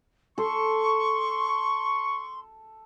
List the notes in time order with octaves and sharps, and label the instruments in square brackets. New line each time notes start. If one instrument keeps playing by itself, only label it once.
[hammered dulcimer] A4 [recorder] C6 [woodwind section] C#6